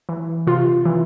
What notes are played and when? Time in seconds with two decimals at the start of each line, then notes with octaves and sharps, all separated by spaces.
0.09 E3
0.47 C3 F4
0.86 E3